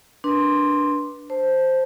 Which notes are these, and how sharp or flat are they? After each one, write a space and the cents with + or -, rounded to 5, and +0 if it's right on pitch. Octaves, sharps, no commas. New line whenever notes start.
D4 +0 B4 -20 C6 +0
C5 +0 A5 +0